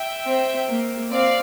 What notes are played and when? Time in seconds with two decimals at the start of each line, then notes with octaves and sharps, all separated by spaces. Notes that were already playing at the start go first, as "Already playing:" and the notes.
Already playing: E5 G5
0.26 C4
0.69 A#3
1.11 C4 D5 F5